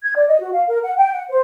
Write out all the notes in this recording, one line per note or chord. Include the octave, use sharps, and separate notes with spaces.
G#6
D5
D#5
F#4
F5
A#4
F#5
G5
F#5
C5